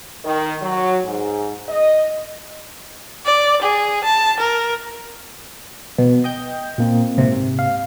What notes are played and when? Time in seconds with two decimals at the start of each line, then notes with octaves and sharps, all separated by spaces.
0.24 D#3
0.60 F#3
1.04 G#2
1.68 D#5
3.25 D5
3.62 G#4
4.04 A5
4.40 A#4
5.98 B2
6.24 D#5 G5 G6
6.78 A#2 A#3 C4
7.18 G#2 C3
7.59 F5